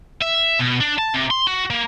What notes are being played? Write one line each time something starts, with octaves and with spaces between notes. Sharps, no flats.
E5
B2
D4
A5
C3
C6
F#4
A#3